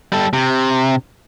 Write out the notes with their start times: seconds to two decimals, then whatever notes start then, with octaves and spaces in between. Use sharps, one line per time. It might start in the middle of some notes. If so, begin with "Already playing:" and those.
0.12 G3 A4
0.33 C3